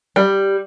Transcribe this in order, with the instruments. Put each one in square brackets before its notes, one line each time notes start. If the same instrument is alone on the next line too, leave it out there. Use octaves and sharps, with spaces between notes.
[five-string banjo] G3